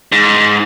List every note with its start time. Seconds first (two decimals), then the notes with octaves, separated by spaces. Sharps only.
0.12 G#2